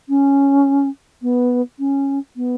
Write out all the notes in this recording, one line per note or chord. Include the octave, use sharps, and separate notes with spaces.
C#4
B3
C#4
B3